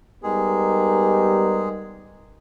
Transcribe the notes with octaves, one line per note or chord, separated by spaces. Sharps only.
G3 G#3 B3 D#4 G4 G#4 A#4